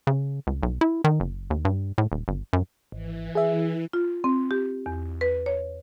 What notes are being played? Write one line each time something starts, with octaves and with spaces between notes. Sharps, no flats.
C#3
C#2
B1
E4
D#3
F#1
D#2
G2
A2
D#1
G1
F#2
G#1 E3
G#4 E5
F4
C4
G4
E2
B4
C#5